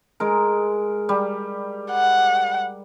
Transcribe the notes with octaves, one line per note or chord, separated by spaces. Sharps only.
G#3 A#4
G3
F#5